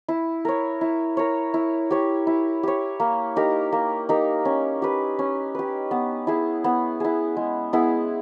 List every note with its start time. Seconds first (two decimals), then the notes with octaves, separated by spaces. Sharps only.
0.08 E4
0.45 A#4 C#5
0.81 E4
1.17 A#4 C#5
1.54 E4
1.91 G4 C#5
2.27 E4
2.63 G4 C#5
3.00 A#3
3.36 D#4 G4 A#4
3.73 A#3
4.09 D#4 G4 A#4
4.45 C#4
4.82 G4 B4
5.19 C#4
5.55 G4 B4
5.91 B3
6.27 E4 G#4
6.64 B3
7.00 E4 G#4
7.37 G#3
7.73 B3 E4 G#4